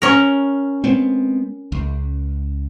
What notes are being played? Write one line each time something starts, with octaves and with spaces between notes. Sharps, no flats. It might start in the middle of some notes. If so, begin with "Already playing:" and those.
C#4 A#4
G#3 B3 C4
C#2